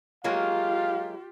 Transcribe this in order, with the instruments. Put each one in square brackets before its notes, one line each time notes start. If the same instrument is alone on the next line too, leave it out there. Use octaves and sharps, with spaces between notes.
[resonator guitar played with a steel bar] F#3 G#3 A#3 [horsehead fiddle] F4 G4 [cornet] F5